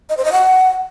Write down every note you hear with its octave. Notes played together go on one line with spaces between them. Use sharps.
D#5
C5
D#5
F#5